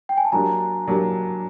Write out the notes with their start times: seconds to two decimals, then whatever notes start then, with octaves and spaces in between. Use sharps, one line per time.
0.09 G5
0.17 G#5
0.25 A5
0.32 F#3 A#3 D4 G4 G#5 A#5
0.88 F#3 A#3 D4 G4